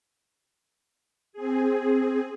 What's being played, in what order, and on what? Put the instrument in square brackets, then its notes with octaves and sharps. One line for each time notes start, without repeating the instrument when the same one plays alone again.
[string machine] C4 G#4